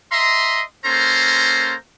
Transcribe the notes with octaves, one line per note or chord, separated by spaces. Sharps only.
D#5 E5 A#5 C6
A#3 C#4 A4 C5 A#5 C6